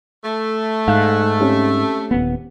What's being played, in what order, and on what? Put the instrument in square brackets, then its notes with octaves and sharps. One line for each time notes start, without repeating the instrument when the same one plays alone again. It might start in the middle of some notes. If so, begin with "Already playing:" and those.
[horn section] A3
[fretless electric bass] G#2 [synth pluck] F5 E6 F#6
[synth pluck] C4 C#4 G4
[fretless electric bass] D#1 B3